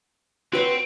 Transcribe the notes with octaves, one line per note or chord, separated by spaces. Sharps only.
C4 F#4 B4 C#5